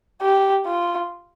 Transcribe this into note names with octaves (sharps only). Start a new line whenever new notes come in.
G4
F4